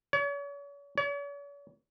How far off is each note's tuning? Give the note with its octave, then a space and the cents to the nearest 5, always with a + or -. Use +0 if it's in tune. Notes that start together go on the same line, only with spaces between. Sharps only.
C#5 +40
C#5 +45